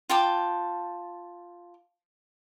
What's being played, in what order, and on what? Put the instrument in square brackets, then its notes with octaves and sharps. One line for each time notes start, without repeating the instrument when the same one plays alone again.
[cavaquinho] F4 G5 A5 D6